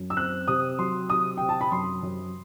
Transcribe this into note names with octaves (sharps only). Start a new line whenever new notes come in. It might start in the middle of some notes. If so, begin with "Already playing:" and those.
Already playing: F#2
E6
C4 F#6
C3 D#6
F#3 C6
C3 D#6
C3 G5
A5
B5
F#2 C6
F#2